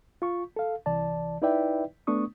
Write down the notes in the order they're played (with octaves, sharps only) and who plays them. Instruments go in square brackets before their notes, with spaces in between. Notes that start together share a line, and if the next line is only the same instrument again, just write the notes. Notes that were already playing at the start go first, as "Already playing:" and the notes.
[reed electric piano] F4 C#6
A4 F5
C2 E3 D5 A5
D#4 E4 B4 D5 E5 G5
A3 B3 D4 C#6 D#6